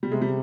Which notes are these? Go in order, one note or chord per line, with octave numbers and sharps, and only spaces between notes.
C3 G3
G#3
G3